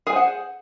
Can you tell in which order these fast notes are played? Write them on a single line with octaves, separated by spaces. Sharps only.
G#4 G#5 C5 F#5